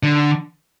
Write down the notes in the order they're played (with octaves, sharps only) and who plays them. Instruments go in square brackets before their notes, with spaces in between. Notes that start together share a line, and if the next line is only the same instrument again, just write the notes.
[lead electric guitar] D3